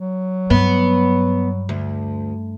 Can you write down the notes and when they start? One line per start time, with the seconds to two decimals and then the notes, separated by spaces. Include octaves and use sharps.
0.01 F#3
0.50 G2 B3
1.69 D2